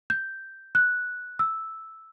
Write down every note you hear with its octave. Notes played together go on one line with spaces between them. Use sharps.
G6
F#6
E6